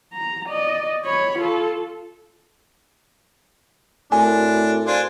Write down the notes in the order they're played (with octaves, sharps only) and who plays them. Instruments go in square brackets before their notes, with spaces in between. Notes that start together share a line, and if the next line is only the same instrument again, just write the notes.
[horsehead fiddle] A#5
D5 D#5
C#5 B5
F4 A4
[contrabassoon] A2 [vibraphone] C4 F#4 A#4 [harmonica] D4 [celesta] G#5
[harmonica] D4 F4 G#5 [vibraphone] C5